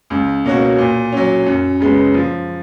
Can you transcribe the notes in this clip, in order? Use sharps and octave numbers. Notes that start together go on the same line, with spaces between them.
C#2
B2 A#3 C#4 F#4
A#2
F#3 C#4
F#2
C#3 G#3 B3
F3